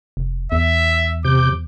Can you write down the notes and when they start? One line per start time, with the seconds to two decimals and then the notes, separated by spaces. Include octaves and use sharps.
0.17 F1
0.52 E2 E5
1.24 C3 D6 G6